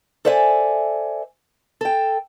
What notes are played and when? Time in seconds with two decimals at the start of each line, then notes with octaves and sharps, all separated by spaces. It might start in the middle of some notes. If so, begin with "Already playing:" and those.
0.25 A4 C5 D5 E5 F5 G#5
1.81 A4 G5